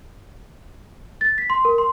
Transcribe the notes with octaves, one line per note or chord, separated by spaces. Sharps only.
A6
B6
C6
A#4
C6